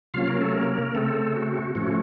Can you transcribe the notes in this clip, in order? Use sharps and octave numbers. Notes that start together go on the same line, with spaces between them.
C3 F#3 A#3 C#4 F4 F5
A#3 A#4
A3 A4
A#3 A#4
C#3 A3 C4 A4
F#4
A2 F3 A3 C#4 F#4